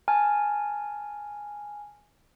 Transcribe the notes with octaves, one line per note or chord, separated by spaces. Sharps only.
G#5 A5 F6